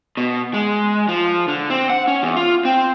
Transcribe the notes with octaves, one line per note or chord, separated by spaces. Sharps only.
B2
G#3
F3
D3
C4
F#5
C#4
E2
F4
C4